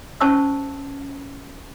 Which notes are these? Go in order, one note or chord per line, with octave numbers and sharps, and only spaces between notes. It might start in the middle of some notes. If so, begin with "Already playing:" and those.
C#4 C5 A5 C#6 E6